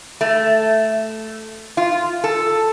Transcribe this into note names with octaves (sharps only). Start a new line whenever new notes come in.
A3
F4
A4